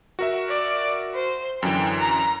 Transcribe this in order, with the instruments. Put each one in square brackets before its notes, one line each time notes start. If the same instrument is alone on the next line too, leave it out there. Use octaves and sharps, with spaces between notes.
[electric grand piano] F#4 A#4 E5
[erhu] D5
C5
[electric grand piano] F#2 D3 E3 [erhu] G5
[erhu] A#5